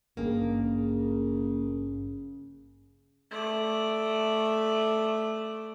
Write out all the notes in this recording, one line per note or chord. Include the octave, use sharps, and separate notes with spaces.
G#1 G2 C#3 A#3 G#4
A3 D5